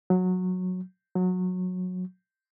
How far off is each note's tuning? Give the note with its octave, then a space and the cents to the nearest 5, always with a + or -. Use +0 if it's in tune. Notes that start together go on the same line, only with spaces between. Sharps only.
F#3 -15
F#3 -20